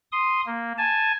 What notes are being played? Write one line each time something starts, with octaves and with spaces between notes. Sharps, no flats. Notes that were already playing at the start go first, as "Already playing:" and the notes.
C6 D#6
A#3
G#5 A5